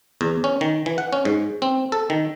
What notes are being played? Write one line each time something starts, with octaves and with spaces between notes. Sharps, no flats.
E2
C#4
D#3
E3
F#5
C#4
G#2
C4
A4
D#3